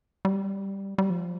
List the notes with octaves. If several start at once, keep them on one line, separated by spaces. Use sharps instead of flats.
G3
G3
F3